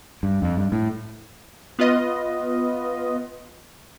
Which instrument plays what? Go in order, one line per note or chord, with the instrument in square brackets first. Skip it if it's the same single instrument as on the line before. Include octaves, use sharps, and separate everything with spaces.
[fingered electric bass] G2
F2
G2
A2
[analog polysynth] B3 F4 B4 D#5